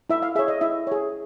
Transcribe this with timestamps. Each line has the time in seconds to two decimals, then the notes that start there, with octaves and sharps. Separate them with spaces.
0.10 E4 E5
0.22 F5
0.35 G#4 C#5 E5
0.48 D#5
0.61 E4 E5
0.87 G#4 C#5